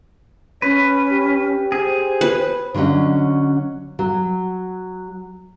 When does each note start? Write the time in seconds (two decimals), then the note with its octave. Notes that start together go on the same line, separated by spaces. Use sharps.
0.62 C#4 B4 C#5
1.10 G4
1.72 G#4 C5
2.21 B4
2.74 D3 F#3 C4 C#4 D#5
3.99 F#3